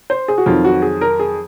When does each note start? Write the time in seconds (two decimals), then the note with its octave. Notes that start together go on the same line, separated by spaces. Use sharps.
0.10 C5
0.28 G#4
0.38 F#4
0.46 F2 D#3 F#3 F4
0.65 F#4
0.82 G#4
1.01 A#4
1.19 G#4